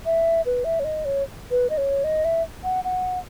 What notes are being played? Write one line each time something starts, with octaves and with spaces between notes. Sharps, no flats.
E5
B4
E5
C#5
D#5
C#5
B4
D#5
C#5
D#5
E5
F#5
F#5